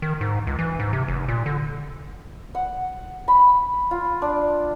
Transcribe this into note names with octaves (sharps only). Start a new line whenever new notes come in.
D#3
G#2
C#2
E3
G#2
C3
F1
A#2
D3
F#5
B5
F4
D4